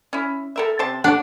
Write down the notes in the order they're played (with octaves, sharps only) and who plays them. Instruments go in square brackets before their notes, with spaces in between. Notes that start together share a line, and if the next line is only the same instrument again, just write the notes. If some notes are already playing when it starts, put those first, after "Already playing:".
[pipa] C#4 E4
A4 A#4 E5
C3 C5 A5
[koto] D4 [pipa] C#5 F#5